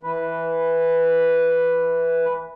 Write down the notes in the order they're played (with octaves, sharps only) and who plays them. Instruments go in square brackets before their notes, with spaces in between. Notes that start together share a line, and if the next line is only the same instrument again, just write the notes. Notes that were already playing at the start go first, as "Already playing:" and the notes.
[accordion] E3 B4